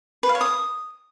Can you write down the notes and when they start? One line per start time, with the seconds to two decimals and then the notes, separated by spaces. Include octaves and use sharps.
0.23 B4
0.29 F5
0.35 C#5
0.41 D#6